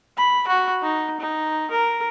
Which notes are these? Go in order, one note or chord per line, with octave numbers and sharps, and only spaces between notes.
B5
F#4
D#4
D#4
A#4